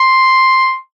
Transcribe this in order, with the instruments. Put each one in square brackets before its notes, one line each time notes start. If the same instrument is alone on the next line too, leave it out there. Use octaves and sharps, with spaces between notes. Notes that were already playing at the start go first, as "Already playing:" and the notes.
Already playing: [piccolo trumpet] C6